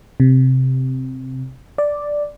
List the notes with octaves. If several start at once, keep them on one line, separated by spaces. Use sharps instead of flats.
C3
D5